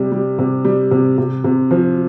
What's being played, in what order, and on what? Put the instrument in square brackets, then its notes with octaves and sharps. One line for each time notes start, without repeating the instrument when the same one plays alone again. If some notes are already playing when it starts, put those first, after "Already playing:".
Already playing: [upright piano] C3 G3
G3
C3
G3
C3
C3
C3
F3